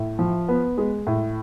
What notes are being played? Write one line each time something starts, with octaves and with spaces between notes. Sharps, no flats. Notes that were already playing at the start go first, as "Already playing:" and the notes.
Already playing: A2
F3
B3
G#3
A2